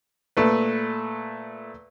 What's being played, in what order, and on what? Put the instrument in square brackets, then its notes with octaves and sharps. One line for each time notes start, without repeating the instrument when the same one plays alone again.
[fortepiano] A#2 A3 B4